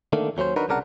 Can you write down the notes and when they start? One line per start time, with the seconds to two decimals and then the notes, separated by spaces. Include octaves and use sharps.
0.13 D3 D#3 A3 A#3
0.37 D#2 F#3 A#3 C#4 C5
0.56 D4 D#4 F#4 A#4 B4
0.69 C2 C#3 D4 A#4 B4 F#5